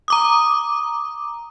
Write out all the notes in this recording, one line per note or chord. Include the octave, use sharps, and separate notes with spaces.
A#5 D6 D#6